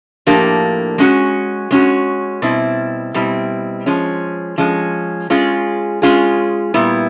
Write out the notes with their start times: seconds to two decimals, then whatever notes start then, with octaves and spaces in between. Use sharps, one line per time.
0.27 A2 F3 A#3 D4 G4
0.98 G#3 C#4 F#4
1.71 G#3 C#4 F#4
2.42 B2 G3 C4 E4
3.14 B2 G3 C4 E4
3.86 F3 G#3 C#4
4.58 F3 G#3 C#4
5.30 G#3 C#4 F4 G#4
6.02 G#3 C#4 F4 G#4
6.74 A#2 G3 B3 E4